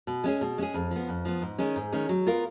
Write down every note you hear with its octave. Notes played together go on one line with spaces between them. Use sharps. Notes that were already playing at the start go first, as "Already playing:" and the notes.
B2
G#3 C#4 G#4
B2
G#3 C#4 G#4
F2
F3 B3
F2
F3 B3
G#2
D#3 G#3 C#4
G#2
D#3 G#3 C#4
F#3
B3 F4 A#4